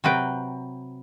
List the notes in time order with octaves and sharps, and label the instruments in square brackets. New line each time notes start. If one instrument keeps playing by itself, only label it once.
[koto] C3 F#3 B4 G5